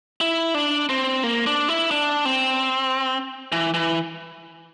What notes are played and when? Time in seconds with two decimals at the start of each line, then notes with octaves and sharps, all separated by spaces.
0.21 E4
0.54 D4
0.89 C4
1.24 A#3
1.46 D4
1.69 E4
1.91 D4
2.25 C4
3.52 E3
3.74 E3